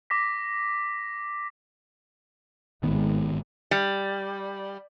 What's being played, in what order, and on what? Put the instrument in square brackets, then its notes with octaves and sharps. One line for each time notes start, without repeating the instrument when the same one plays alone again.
[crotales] D6 A#6 B6
[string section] G#1 [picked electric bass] D#3 B3
[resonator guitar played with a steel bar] G3